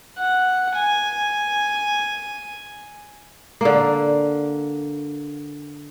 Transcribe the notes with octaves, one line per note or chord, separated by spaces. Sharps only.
F#5
G#5
D3 A#3